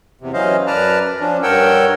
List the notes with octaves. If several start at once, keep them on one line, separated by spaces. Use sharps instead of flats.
E2 C3
E3 F#3 C#4 C5 D#5 F5
F#2 B4 D5 A5 A#5 F6
F3 C#4 D4
G2 A#4 C#5 F#5 G5 E6